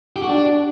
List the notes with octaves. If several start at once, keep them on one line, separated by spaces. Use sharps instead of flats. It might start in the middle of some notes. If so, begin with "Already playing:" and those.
G4
F#4
D4